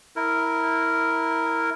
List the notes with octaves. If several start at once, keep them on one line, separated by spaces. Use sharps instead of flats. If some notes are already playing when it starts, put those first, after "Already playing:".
E4 A#4